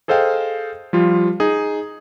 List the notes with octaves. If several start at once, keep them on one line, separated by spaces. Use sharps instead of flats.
G#4 A4 C5 D#5 F5 G5
F3 G3 F4
D#4 G#4